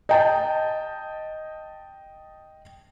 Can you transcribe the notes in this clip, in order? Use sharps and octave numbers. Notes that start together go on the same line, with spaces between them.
D#5 G5 A5